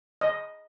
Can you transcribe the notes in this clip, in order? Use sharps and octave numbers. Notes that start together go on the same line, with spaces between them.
D#5